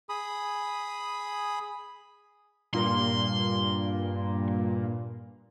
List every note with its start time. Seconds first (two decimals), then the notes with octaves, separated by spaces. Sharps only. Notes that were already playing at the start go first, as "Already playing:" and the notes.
0.09 G#4 B5 D#6
2.74 G2 A#2 A#3 C6